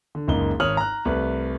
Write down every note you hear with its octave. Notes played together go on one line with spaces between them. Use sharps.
D3
F#1 C#2 A#3 D#4 G7
G#1 C#5 D#6 F6 F#7
A#5 F#6
C2 A3 B4 F#6